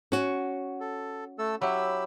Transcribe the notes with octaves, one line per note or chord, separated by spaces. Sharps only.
C#4 F#4
A4
A3 A4 E6
F#3 E4 G4 B5 E6